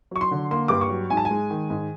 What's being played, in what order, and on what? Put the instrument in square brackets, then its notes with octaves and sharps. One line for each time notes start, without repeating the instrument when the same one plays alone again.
[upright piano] F#3 C#6
C6
D3
A#3 C6
G2 D6
C#6
F#3
G#2 G#5
A5
G#5
G#3
D#3
G#2